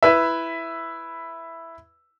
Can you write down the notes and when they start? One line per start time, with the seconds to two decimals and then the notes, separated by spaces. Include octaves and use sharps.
0.03 E4 B4 E5